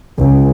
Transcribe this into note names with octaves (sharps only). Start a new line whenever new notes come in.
C#2